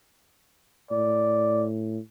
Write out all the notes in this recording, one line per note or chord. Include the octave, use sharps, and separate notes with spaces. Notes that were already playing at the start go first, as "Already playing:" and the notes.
A2 D5